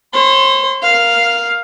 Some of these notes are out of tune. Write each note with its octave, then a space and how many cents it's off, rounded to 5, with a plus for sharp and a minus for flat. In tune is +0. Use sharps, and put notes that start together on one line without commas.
C5 +45 C6 -30
A#4 +15 F5 +0